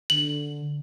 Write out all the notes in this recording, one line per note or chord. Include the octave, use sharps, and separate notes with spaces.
D3 F#7